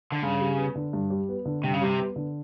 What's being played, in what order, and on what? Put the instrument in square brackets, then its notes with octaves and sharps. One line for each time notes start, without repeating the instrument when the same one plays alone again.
[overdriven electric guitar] D3
[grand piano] G2 [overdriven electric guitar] C#3
[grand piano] G3
B3
D3
G2
G3
B3
D3
[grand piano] G2 [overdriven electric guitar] C3
[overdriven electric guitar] C#3
[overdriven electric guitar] C3 [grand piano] G3
[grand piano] B3
D3